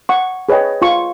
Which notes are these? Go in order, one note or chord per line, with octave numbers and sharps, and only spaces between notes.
F#5 C#6
G#4 B4 C#5 D#5 G5
F4 C#6